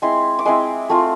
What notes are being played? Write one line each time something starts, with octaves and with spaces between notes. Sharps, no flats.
G#3 C4 E4 C6
D6
G#3 C4 E4 C6
A3 C4 F4